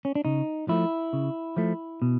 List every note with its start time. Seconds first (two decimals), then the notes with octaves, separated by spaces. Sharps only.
0.05 C#4
0.15 D4
0.25 C#3 D#4
0.68 F3 A3 E4
1.13 C#3
1.57 F3 A3
2.02 B2